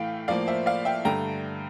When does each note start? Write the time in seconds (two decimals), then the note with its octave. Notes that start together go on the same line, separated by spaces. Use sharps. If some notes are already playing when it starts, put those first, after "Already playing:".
Already playing: A2 E3 A3 F5 G5
0.28 A2 F3 A#3 D5 F5
0.47 C5 E5
0.66 D5 F5
0.85 E5 G5
1.05 G2 D3 A3 G5 A#5